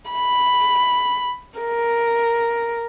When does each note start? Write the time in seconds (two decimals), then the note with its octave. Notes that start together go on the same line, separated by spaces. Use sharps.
0.11 B5
1.60 A#4